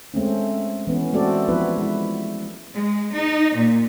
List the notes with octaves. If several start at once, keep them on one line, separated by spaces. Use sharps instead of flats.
G#3 A3 C4 C#4
E3 B3 C#4
G#3 A3 C4 F#4 A4 D5
F3 B3 E4 B4
G#3 E4
G#3
D#4
A#2